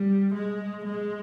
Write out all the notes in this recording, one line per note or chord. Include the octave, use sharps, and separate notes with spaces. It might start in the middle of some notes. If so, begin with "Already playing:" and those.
Already playing: G3
G#3
G#3